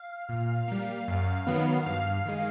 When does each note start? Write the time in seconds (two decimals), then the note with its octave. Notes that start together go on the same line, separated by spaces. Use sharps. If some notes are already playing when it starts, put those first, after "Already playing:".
Already playing: F5
0.29 A#2
0.68 G3 A#3
1.08 F#2
1.47 D#3 F#3 B3
1.86 G2 F5
2.25 D#3 G#3